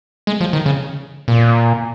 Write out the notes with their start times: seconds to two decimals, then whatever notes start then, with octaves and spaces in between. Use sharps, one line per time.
0.27 G#3
0.41 F3
0.53 D#3
0.66 C#3
1.28 A#2